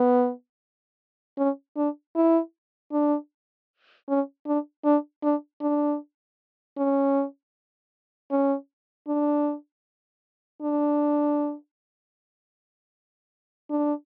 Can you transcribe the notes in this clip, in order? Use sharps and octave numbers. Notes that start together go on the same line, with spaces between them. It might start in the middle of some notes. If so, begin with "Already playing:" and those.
Already playing: B3
C#4
D4
E4
D4
C#4
D4
D4
D4
D4
C#4
C#4
D4
D4
D4